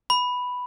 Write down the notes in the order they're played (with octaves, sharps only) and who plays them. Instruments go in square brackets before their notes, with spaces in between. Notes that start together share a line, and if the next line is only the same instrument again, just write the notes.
[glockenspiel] B5